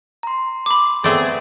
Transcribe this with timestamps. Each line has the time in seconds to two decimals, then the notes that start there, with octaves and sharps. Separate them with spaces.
0.23 A#5 C6
0.66 B5 D6
1.04 A3 B3 C4 G#4 D5